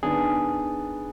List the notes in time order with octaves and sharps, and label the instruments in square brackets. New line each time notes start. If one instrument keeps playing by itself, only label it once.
[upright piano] D#3 B3 D4 [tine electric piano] G#4